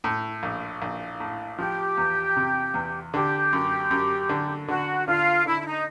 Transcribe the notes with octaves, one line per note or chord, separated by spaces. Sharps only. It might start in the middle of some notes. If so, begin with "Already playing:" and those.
A2
A#1
A#1
A2
F3 G4
E2
C3
E2
D3 G4
F#2
F#2
D3
D3 F#4
D3 F4
D3 E4
E4
D#4